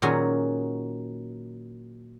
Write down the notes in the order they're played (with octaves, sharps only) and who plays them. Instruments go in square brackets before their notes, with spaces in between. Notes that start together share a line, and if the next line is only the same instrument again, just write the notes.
[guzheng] A#2 D#3 F#3 C#4 F#4 G#4